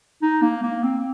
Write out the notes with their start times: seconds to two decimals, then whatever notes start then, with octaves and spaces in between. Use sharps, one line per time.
0.23 D#4
0.43 A#3
0.64 A#3
0.84 C4